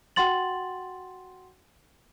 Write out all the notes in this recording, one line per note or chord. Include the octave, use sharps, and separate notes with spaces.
F#4 F#5 G5 C6 A6 F#7